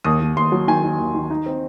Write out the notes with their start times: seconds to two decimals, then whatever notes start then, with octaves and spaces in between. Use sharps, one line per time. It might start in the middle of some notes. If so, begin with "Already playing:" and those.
0.04 D#2 D#6
0.20 D#2
0.36 D#2 C6
0.52 F#3
0.68 D#3 G#5
0.83 D#3
0.99 D#2
1.15 D#3
1.30 D#4
1.46 C4